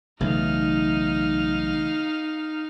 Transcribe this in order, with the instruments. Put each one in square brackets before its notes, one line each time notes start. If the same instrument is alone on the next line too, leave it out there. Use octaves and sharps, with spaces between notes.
[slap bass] B1 [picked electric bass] C#3 E3 A3 [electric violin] D#4 F5